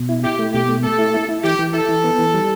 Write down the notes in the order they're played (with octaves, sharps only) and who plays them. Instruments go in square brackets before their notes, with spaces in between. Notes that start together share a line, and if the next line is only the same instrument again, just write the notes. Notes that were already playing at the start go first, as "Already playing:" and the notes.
Already playing: [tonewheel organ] B2
E4
[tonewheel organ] E4 [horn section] G4
[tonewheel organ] A3
[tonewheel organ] B2 [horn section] G4
[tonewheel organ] A3
[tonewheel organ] A3 [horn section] A4
[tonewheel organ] E4
E4
E4
[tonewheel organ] E3 [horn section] G4
[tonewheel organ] E3
[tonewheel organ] E4 [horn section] A4
[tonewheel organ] E3
B3
E3
G3